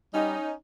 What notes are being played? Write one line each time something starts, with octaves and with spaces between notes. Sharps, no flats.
G3 C#4 D#4